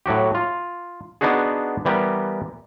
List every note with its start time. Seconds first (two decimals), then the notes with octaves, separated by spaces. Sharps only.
0.06 A2 F#3 F#4 G4
0.35 F4
1.21 B3 D4 D#4 F#4 G#4
1.85 E3 G3 B3 G4 A#4